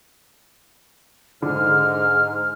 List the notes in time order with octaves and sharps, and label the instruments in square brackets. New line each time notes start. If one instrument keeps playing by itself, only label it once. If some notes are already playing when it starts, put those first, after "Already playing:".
[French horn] G#2 [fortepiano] D3 [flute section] F6